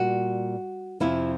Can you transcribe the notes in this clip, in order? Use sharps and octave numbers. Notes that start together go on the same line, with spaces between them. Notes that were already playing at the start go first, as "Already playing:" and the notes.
Already playing: A#2 G3 F#4
F2 C3 F3 E4